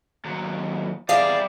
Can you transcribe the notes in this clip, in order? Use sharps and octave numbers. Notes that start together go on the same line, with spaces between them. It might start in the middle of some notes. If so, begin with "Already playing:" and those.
D#2 F#3
E2 G3 G#4 D5 E5 F5